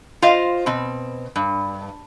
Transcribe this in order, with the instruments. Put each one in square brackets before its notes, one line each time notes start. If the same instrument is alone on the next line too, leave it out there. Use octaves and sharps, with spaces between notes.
[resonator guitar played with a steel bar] F4 C5 D#5 F5
B2 C4
G2